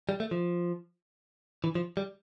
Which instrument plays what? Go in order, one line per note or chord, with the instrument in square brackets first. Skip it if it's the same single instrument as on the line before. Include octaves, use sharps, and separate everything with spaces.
[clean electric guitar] G3
A3
F3
E3
F3
G3